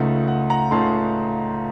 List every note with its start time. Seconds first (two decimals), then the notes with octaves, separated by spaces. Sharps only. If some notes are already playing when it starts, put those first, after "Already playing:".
Already playing: C#2 C#3 A3 D#4 F#5
0.28 F#5
0.50 F#5 A#5
0.71 C#2 C#3 A3 D#4 A5 C6